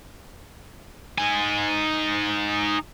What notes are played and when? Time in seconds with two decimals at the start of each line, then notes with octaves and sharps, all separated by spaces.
1.18 D#4 G#5